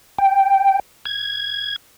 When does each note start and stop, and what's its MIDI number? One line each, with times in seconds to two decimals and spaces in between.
0.18 0.80 79
1.05 1.76 92